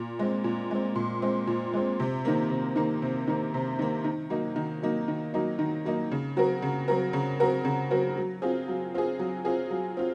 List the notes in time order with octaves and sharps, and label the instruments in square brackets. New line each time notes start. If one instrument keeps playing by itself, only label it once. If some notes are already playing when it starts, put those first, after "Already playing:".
Already playing: [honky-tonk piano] A#2
G#3 C4
A#2
G#3 C4
A#2
G#3 C4
A#2
G#3 C4
C3
D#3 A#3
C3
D#3 A#3
C3
D#3 A#3
C3
D#3 A#3
D#3
F#3 A#3 D#4
D#3
F#3 A#3 D#4
D#3
F#3 A#3 D#4
D#3
F#3 A#3 D#4
C#3
F#3 C4 F#4 A#4
C#3
F#3 C4 F#4 A#4
C#3
F#3 C4 F#4 A#4
C#3
F#3 C4 F#4 A#4
F#3
C4 F4 G#4
F#3
C4 F4 G#4
F#3
C4 F4 G#4
F#3
C4 F4